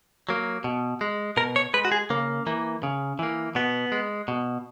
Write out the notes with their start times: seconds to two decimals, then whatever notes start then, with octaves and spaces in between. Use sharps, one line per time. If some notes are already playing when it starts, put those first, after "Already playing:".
0.29 F#3 A#3
0.64 B2
1.01 G#3
1.37 B2 A#4
1.56 C#5
1.74 G#3 B4
1.85 F#4
1.92 G#4
2.10 C#3 A#3
2.47 E3 A#3
2.83 C#3
3.19 E3 A#3
3.55 B2 B3
3.92 G#3
4.28 B2